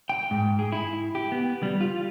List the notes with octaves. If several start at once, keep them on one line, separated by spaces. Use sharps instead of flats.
G5
G#2
G#4
E4
G4
B3
G3
F4